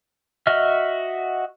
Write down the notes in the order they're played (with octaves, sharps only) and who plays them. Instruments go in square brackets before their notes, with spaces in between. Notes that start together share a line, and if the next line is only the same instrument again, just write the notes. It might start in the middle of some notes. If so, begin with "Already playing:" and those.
[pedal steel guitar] F#4 D#5 E5 F6